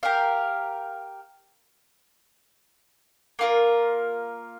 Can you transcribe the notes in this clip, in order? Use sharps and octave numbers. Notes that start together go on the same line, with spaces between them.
G4 A#4 F5
A#3 F4 A#4